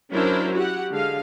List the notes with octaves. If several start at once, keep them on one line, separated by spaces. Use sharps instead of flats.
F#3 C#4 D4 E4 A#4 C5
E4 F#4 G4 F#5
D3 G#3 F5